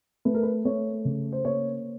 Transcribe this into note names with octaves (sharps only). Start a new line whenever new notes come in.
A3 B4
A#4
B4
A3 C#5
C#3
C5
A#3 C#5